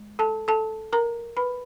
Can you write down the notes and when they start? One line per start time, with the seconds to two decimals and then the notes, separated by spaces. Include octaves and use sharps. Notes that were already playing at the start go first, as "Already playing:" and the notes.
Already playing: G#3
0.19 A4 A5
0.48 A4 A5
0.93 A#4 A#5
1.37 B4 B5